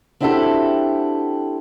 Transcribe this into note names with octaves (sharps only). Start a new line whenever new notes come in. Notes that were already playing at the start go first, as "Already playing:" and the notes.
C4 D4 E4 F#4 G4 A4